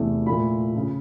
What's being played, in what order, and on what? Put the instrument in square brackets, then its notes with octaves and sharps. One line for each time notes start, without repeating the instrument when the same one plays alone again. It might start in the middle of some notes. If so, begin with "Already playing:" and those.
Already playing: [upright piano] E2 C3 E3 A3
A#2 F3 A3 B5
C#3 F3